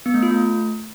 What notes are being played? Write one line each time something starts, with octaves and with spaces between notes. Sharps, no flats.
B3
A3
F4
A3